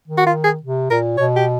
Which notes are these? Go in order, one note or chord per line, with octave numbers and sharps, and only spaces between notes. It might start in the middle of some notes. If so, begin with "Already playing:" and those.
D#3
F#4
F4
G#4
C3
A#2 A#4
B2 C#5
G4